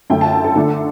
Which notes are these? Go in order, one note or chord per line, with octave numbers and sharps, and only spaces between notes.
F#2 D3 A3 G5
A5
G5
A4
D3 A3 D4